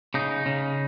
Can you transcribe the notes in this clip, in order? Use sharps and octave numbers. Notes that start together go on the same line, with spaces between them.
C#3 D#4
C#3